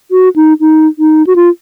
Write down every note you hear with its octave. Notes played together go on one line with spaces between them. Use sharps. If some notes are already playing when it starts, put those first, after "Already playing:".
F#4
D#4
D#4
D#4
F#4
F4